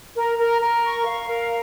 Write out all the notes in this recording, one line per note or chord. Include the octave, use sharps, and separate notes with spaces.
A#4
A#4
A#4
C#6
F5
A#4